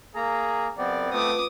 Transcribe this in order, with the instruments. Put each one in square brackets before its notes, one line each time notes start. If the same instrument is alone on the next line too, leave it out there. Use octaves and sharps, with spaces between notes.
[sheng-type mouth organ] A#3 A#5 [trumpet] G#4
[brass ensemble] C#2 F#2 [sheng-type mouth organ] B3 C4 [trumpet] D5
[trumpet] A3 [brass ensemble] F4 B4 [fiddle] D6 D#6